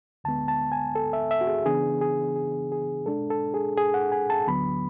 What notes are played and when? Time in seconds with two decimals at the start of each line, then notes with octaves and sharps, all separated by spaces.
0.24 D2 D3 G#3 B3 A5
0.48 A5
0.72 G#5
0.95 A4
1.13 E5
1.31 E5
1.41 F#4
1.47 G#4
1.65 C#3 E3 B3 D4 G#4
2.01 G#4
2.36 G#4
2.72 G#4
3.06 B2 G#3 D4 A4
3.30 A4
3.54 G#4
3.78 G#4
3.94 F#5
4.12 G#5
4.30 A5
4.47 D2 D3 F#3 B3 B5